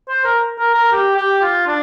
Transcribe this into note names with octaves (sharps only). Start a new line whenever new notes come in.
C5
A#4
A#4
A#4
G4
G4
F4
D4